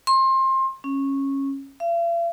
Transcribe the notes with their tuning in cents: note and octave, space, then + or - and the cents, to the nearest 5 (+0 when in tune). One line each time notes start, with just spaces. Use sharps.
C6 +25
C#4 -15
F5 -45